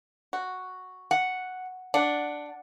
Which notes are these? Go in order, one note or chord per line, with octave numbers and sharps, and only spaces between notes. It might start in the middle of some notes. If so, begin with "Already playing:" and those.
F#4
F#5
D4 F#5